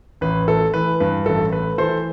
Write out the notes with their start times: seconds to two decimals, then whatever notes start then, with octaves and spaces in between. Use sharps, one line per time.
0.21 A1 B4
0.48 A3 A4
0.74 E3 B4
1.00 G2 B4
1.26 A1 A4
1.52 A3 B4
1.78 E3 A4 C5